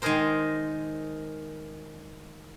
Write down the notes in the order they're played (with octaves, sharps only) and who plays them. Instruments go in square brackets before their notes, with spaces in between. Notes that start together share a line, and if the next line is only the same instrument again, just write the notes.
[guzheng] D#3 G#3 D#4 G#4 A#4 C5